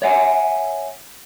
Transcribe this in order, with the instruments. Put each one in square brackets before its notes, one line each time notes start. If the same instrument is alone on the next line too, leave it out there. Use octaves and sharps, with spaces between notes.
[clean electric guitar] C#5 E5 F#5 G#5